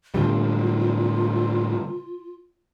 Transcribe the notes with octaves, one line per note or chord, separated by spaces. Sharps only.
A2 D3 G3 F4